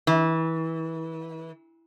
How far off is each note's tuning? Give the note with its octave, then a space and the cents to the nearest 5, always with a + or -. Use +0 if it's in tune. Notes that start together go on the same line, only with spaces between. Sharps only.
E3 -25